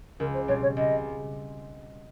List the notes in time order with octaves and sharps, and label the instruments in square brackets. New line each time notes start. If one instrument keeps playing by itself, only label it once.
[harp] C#2 [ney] A#4
[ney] C5
[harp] B2 G3 C4 [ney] C#5
[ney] C#5
[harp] C#2 [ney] D#5